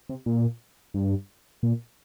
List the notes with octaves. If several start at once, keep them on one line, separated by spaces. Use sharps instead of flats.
C3
A#2
G2
A#2